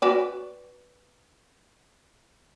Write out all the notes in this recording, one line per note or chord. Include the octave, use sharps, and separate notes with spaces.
F#4 B4 D5